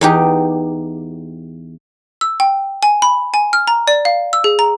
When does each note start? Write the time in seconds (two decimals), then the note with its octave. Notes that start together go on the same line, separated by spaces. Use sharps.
0.01 E2 D#4 G4
2.21 E6
2.40 G5
2.83 G#5
3.02 B5
3.34 G#5
3.53 F6
3.67 A#5
3.88 D5
4.05 F5
4.33 E6
4.44 G#4
4.59 A#5